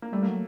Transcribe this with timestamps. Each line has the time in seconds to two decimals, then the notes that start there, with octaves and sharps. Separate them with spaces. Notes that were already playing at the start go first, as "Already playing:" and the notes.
0.02 A#3
0.12 G3 A3
0.23 F#3 A#3